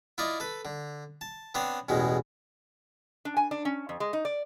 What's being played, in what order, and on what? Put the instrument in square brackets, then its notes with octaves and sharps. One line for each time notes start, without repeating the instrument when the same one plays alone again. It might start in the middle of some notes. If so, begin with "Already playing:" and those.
[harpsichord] E4 F4 D5 D#5
A4 B4
D3
A5
B3 C4 D4 C5 C#5
A1 E2 B2 G#3
[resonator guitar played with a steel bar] D4
G#5
D4
C#4
F2
G#3
D#4
D5